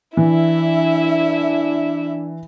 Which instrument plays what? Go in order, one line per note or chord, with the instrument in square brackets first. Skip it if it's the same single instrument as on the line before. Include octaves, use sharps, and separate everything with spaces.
[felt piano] E3 [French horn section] D4 [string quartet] E4 E5